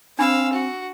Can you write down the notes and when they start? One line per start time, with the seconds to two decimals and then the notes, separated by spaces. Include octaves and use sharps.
0.19 C4 D4 F5 G#5 B5 E6
0.52 F#4